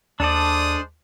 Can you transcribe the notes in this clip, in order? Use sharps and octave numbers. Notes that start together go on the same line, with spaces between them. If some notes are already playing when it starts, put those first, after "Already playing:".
D#2 G#3 D4 A4 C5 D5 A5 D#6